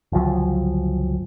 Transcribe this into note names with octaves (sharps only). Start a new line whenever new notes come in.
G1 C#2 F3 F#3